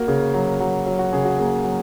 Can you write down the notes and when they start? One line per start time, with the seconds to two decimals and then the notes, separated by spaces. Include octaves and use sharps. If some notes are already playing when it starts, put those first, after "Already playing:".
Already playing: A#3 F#4 A#4
0.08 C#3
0.34 F#3
0.60 F#3
0.86 F#3
0.99 F#4
1.13 C#3 G#4
1.25 F#4
1.39 A#3 G#4
1.64 F#3